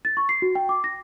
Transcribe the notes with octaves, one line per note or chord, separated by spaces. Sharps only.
A6
C#6
C7
F#4
G5
D6
A#6